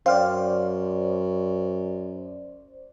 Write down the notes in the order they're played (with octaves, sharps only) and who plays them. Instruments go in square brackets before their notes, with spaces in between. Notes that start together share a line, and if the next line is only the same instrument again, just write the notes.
[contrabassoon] F#2 [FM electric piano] C5 D5 [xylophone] F5 G5 F6